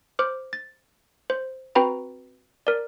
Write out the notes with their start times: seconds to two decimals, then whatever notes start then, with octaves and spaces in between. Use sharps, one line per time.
0.19 C5 D6 F6
0.53 A6
1.30 C5
1.75 C4 F#4 B4 G5 A#5 B5
2.67 A#4 D5